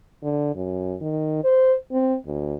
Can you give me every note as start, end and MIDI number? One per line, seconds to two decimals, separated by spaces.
0.23 0.54 50
0.56 0.95 42
1.01 1.43 51
1.44 1.75 72
1.91 2.16 60
2.26 2.55 38